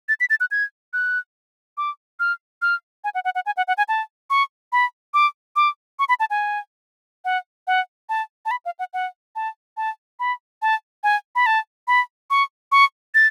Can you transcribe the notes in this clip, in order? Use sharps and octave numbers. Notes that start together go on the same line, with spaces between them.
A6
B6
A6
F#6
G#6
F#6
D6
F6
F6
G#5
F#5
F#5
F#5
G#5
F#5
F#5
G#5
A5
C#6
B5
D6
D6
C#6
B5
A5
G#5
F#5
F#5
A5
A5
B5
F5
F#5
F#5
A5
A5
B5
A5
G#5
B5
A5
B5
C#6
C#6
A6